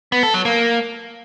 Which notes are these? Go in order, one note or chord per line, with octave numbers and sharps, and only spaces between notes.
B3
A4
F#3
A#3